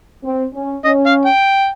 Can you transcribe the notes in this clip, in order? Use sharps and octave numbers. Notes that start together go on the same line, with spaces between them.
C4
C#4
C#4 D#5
F5
G5